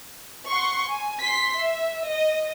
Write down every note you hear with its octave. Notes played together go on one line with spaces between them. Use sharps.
F#5 C6 C#6
G#5
C6 B6
E5
D#5